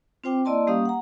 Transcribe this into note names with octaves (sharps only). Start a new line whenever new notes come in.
C4 F4 C5 G5 D6
A#3 E4 D5 D#5 A5 C6
G3 A#3 C#4 G4 F5 D#6
F#5 A#5